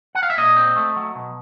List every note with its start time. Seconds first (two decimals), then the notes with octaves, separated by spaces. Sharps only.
0.15 F#5
0.23 F5
0.30 E5
0.37 A#2 D#5
0.56 C4
0.76 A3
0.96 F#3
1.15 B2